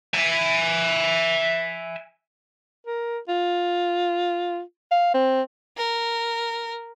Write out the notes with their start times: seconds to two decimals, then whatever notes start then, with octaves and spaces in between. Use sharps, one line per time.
0.14 E5 G#5
2.87 A#4
3.28 F4
4.91 F5
5.14 C4
5.77 A#4